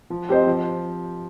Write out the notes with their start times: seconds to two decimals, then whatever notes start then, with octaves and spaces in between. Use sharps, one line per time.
0.10 F3
0.29 C4 G4 C5 D#5
0.47 F3